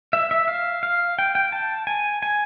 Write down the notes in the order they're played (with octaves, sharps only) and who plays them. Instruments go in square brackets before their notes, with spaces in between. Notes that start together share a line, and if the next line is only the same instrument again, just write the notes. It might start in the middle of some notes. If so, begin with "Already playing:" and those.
[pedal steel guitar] E5
E5
F5
F5
G5
G5
A5
G#5
G#5